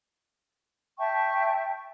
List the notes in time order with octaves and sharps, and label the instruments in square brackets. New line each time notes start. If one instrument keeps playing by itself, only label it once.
[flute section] E5 G5 A5 C#6